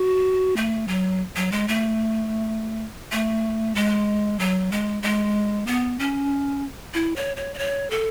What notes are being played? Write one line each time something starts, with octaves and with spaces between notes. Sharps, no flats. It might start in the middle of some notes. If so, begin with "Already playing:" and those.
Already playing: F#4
A3
F#3
F#3
G#3
A3
A3
G#3
F#3
G#3
G#3
B3
C#4
E4
C#5
C#5
D5
C#5
A4